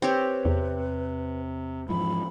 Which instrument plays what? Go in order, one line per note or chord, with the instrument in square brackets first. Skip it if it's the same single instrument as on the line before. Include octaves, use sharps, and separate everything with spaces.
[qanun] C4 G4 C#5 [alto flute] B4
[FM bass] E2 [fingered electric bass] C3
[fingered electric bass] G#2 E3 F3 [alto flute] B5